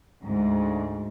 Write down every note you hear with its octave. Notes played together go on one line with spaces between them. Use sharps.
D2 G#2